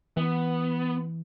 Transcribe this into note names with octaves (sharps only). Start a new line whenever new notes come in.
E3 B3